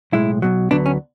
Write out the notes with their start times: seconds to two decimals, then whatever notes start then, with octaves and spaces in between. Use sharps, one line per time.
0.12 B1 A2 G#3 E4
0.42 B1 B2 F#3
0.71 D2 D3 F#3 B3 D4
0.86 C#4